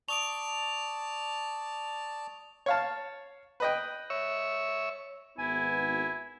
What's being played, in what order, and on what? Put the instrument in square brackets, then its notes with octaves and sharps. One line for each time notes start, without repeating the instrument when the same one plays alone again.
[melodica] D5 A5 [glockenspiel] C#6 D#6 D7 [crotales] F7
[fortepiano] C#5 F5 A5
B4 D#5 G5
[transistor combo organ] C#5 E5
[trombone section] G#1 B3 [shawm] E4 [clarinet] G#5